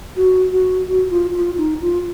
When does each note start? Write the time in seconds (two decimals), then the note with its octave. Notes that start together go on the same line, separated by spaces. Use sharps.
0.17 F#4
0.52 F#4
0.88 F#4
1.11 F4
1.34 F4
1.58 D#4
1.81 F4